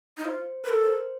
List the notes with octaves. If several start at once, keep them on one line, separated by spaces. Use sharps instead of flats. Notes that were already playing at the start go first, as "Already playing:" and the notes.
D#4
F4 C5
A#4 B4
A4
C5